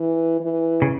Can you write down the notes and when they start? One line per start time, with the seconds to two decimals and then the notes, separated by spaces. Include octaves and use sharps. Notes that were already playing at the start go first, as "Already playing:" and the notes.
Already playing: E3
0.40 E3
0.82 C#3